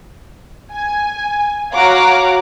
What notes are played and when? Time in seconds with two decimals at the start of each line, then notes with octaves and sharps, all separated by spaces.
0.72 G#5
1.74 F#4 C#5 F5 F#5 A#5 D6